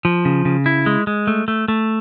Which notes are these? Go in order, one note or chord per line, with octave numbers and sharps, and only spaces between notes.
F3
C#3
C#3
E4
G#3
G#3
A3
A3
A3